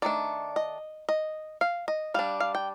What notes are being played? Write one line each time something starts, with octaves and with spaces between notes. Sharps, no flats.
D#3 A3 D4 D5
D#5
D#5
F5
D#5
G3 D4 F5
F5
G5